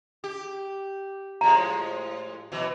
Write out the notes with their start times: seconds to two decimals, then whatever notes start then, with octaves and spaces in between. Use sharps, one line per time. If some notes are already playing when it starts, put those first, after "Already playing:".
0.24 G4
1.41 A2 F3 G#3 A#5
2.52 B2 E3 F#3